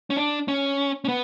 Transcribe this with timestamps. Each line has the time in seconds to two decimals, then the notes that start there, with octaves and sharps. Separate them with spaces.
0.10 C#4
0.17 D4
0.48 C#4
1.05 C#4
1.08 B3